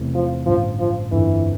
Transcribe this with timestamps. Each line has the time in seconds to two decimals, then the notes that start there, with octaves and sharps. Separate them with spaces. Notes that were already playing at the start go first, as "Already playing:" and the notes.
Already playing: E2 C3 E3 A3 C4
0.14 F3
0.46 A1 G2 D3 F3
0.79 F3
1.12 G1 F2 D3 E3